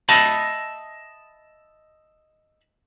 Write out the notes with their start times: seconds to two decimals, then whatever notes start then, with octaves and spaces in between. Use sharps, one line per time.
0.09 D#5 E5 A5 B5